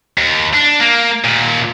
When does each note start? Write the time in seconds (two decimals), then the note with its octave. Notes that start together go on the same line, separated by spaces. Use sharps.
0.18 D#2
0.53 D4
0.80 A#3
1.24 D#2 A#2